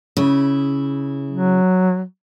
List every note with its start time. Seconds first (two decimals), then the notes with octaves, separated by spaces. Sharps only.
0.17 C#3 E4
1.31 F#3